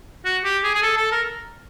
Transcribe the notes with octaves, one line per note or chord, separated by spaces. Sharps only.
F#4
G4
G#4
G#4
A4
A4
A#4